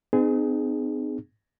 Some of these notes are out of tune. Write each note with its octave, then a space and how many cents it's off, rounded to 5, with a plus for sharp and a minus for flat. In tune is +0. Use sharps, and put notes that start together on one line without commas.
C4 -45 D#4 -40 G#4 +0